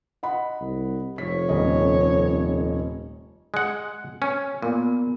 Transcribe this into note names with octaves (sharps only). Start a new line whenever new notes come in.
D#5 F#5 B5
C2
F1 C#5 B6
D#1 C#4 D#5
G#3 F#5
C#4
A#2 B3